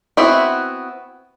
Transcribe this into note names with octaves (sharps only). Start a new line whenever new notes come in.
B3 C4 E4 F#4 E5